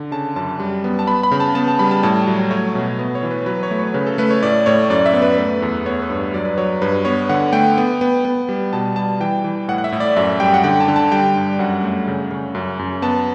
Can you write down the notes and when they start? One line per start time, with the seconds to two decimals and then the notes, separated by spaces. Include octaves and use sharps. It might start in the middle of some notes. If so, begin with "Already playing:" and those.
Already playing: D3
0.12 C#3 A5
0.36 F#2 A5
0.60 G3
0.84 B3
0.99 A5
1.07 B3 B5
1.23 B5
1.31 C#3
1.40 A5
1.55 B3 A5
1.68 A5
1.79 G3 B5
1.91 A5
2.03 A2 A5
2.27 F#3
2.51 A3 C#5
2.75 B2
2.99 B3
3.15 C#5
3.23 E3
3.31 B4
3.46 F#3 B4
3.63 C#5
3.71 A3
3.79 C#5
3.94 C#3 B4
4.07 A4
4.18 A3 B4
4.31 C#5
4.43 A2 D5
4.66 A2 C#5
4.90 F#2 D5
5.06 E5
5.14 B3
5.22 B4
5.38 A3 B4
5.62 E2
5.86 B3 C#5
6.02 B4
6.10 G2
6.34 F#3 D5
6.45 B4
6.58 F#3 C#5
6.82 G2 B4
7.05 B3 C#5
7.29 D3 F#5
7.53 A3 G5
7.78 B3
8.01 B3
8.25 B3
8.49 G3
8.73 B2 A5
8.96 G3 A5
9.20 E3 G5
9.44 E3
9.68 A2 F#5
9.78 F#5
9.84 E5
9.92 A2
10.00 D5
10.16 F#2 E5
10.40 G3 G5
10.54 F#5
10.64 D3 G5
10.80 A5
10.88 D3
10.96 A5
11.12 G3 G5
11.36 G2
11.59 F#2 F#5
11.83 A3
12.08 C#3
12.31 C#3
12.55 F#2
12.79 F#2
13.02 B3 A5